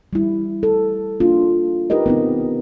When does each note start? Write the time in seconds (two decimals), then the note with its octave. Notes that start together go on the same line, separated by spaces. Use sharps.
0.13 G3 E4
0.63 A4
1.20 A#3 D4 F4
1.90 D#4 G4 A#4 B4 D#5
2.06 B3 C4 D#4